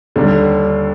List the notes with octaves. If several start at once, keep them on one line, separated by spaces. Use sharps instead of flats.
D#2 D3 G3 D4